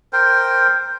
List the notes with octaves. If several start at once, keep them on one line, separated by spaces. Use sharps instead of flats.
A#4 C5 G5